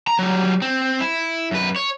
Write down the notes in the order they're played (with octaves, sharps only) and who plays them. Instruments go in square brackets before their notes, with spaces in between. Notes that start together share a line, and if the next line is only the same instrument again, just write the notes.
[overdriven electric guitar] A#5
F#3 G3
C4
E4
F#2 B4
C#5